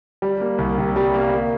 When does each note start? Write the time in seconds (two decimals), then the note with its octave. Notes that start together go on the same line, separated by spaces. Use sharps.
0.22 G3
0.40 A#3
0.58 C2
0.78 C3
0.96 G3
1.14 A#3
1.32 A#3